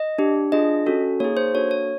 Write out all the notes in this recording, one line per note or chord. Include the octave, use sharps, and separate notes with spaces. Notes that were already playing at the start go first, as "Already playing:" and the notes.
Already playing: D#5
D4 G4
D4 F4 G#4 D#5
C#4 F#4 A4
A#3 D#4 G#4 C#5
C5
A#3 D4 F#4 A4 C#5
C#5